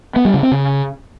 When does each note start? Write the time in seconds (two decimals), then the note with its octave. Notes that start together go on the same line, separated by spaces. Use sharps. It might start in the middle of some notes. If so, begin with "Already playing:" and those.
0.16 B3
0.25 G3
0.34 C#3
0.43 C4
0.52 C#3